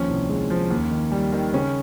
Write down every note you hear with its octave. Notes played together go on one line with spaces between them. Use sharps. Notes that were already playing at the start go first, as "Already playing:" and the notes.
Already playing: D#2 F3 C#4
C2
G#3
F3
D#2
D#3
G3
D#3
C#3 C#4